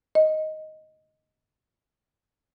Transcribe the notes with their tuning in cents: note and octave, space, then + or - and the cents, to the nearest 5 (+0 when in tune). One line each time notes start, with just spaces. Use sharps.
D#5 +5